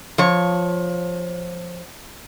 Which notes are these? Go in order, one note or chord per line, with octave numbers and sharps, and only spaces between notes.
F3 C#5